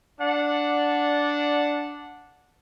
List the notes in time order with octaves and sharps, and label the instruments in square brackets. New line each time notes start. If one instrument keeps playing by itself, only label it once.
[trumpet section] D4 D5 F#5